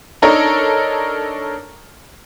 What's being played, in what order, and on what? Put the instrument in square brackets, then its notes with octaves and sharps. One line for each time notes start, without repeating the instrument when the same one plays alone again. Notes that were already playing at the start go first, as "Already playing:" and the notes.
[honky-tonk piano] D4 D#4 A4 A#4 C#5